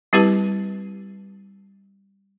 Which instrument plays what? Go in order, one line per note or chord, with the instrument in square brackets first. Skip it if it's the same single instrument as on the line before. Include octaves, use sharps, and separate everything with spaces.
[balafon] G3 C4 E4 G4 B4 A5